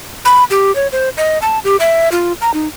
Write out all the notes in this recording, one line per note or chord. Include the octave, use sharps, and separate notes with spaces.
B5
G4
C#5
C5
D#5
A5
G4
E5
F4
A#5
D#4